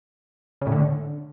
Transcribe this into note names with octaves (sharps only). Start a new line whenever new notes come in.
C#3
A2
D3